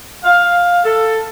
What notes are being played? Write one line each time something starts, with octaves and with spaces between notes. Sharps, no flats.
F5
A4